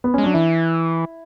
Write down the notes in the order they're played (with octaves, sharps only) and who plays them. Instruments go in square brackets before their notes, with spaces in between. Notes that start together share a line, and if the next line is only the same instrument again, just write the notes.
[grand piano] B3
[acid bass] G#3 [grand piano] C#4
[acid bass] F#3 [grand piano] D4
[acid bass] E3 [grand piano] E4